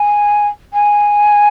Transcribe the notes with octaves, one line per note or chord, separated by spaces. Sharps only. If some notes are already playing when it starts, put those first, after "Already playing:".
Already playing: G#5
G#5